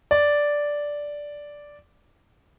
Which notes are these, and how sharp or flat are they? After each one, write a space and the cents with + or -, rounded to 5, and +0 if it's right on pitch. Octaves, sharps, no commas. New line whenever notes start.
D5 -5